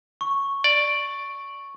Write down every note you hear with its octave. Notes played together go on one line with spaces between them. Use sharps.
C#6
D5